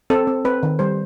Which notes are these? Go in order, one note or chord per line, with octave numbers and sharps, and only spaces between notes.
C4 A4
C4
C4 B4
D#3
G3 C5